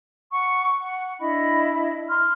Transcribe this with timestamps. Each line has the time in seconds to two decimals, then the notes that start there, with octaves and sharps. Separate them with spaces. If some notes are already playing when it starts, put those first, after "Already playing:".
0.32 F#5 C#6
0.80 F#5
1.20 D4 E4 D#5 B5
2.08 C6 F6